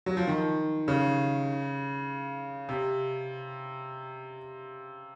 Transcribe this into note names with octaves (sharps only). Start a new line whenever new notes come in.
F#3
F3
D#3
C#3
C3